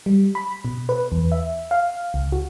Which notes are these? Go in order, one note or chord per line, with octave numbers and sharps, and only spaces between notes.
G3
B5
B2
B4
E2
E5
F5
C#2
F#4